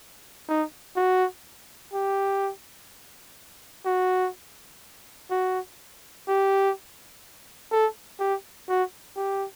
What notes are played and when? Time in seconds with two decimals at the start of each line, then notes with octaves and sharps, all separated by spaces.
0.48 D#4
0.96 F#4
1.93 G4
3.85 F#4
5.30 F#4
6.27 G4
7.72 A4
8.20 G4
8.68 F#4
9.16 G4